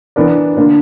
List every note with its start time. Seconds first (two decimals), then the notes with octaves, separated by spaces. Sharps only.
0.16 E3 B3 D4 A#4 D5
0.57 D3 A#3 D4